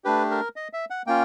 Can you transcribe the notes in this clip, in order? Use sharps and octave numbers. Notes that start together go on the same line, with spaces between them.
A3 D4 G4 B4
A#4
D#5
E5
F#5
A#3 C#4 F4 G5